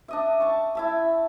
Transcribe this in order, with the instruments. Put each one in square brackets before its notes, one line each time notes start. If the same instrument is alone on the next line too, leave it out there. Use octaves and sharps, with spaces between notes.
[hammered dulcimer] D4 D#5 E5
A5 C#6
E4 E5 A5